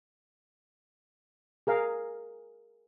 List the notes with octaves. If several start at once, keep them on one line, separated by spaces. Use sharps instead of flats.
G#4 A#4 F5